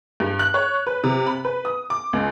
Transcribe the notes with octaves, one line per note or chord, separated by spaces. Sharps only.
G2
F#6
C#5
B4
C3
B5
B4
D#6
D6
C#2